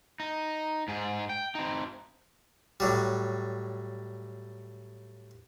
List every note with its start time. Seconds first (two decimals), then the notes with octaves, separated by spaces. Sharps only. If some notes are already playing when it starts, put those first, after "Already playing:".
0.20 D#4
0.88 G#2 G#4
1.29 G5
1.55 C4 D#4
2.80 A2 F#3 G3